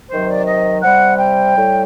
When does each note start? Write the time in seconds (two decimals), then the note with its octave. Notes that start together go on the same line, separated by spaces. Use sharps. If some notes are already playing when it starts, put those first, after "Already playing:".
0.11 C3 D#3 F#3 C5
0.30 D5
0.47 D#5
0.82 C3 G3 F#5
1.18 G5
1.55 A2 G3